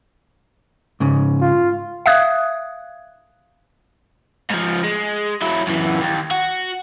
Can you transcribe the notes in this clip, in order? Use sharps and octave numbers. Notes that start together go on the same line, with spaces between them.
G#2 C#3
F4
E5 F5 D#6 F#6 G#6
G#2 F3
G#3
F#3 E4
F#2 E3
D#2
F#4